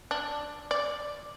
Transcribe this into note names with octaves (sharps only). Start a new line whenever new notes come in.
D4
D5